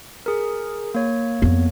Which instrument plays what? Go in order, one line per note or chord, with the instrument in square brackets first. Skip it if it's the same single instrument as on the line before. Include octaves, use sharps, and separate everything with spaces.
[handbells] G#4 A#4
A#3 C#5
[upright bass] F2 B3